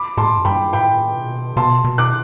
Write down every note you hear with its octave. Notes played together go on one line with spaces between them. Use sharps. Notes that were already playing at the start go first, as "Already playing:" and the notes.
Already playing: B5 D6
A2 A5 C6
F#2
G2 G5 B5
A2 G5 B5
B2
B2 A5 C6
B2
D6 F#6